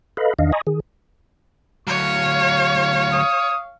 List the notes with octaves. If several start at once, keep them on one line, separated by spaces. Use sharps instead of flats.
A4 B4 D#5 F5 B5
E2 D#3 D4 D#5 F5
D#5 G#5 A#5 B5 C#6 D#6
D#3 G#4
D2 F#3 C#5 F5 C#6
D#6